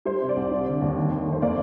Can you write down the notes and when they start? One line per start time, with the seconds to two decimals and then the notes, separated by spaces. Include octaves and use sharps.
0.05 G3 C5
0.21 C3
0.29 D5
0.36 C2
0.51 G3
0.67 D3
0.81 D#2
0.96 D#3
1.11 D#2
1.27 F1
1.32 C5
1.42 A#3 D5